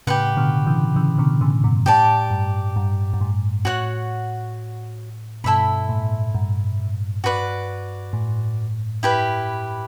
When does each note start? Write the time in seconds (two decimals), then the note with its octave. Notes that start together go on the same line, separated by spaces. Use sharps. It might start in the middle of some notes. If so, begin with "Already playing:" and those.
0.07 A2 C#3 G4 B4 F#5
0.37 B2 D3
0.66 C#3 E3
0.96 C#3 E3
1.18 B2 D3
1.41 A2 C#3
1.64 G2 B2
1.86 A2 G4 D5 A5
2.30 G2
2.76 G2
3.13 G2
3.21 A2
3.65 A2 F#4 C#5 F#5
5.44 G2 B2 E4 A4 E5 B5
5.89 A2
6.35 G2
7.24 F#4 B4 D5
8.13 A2
9.03 E4 G4 B4